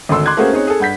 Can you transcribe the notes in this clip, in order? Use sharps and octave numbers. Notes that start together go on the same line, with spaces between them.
G#1 D2 A4 C6 E6
C6 D6 F#6 G#6
A3 A#3 C#4 F#4 G#4 C5
C4 D#4 G#4 C#5
G#4 A4
G2 F#5 G6 B6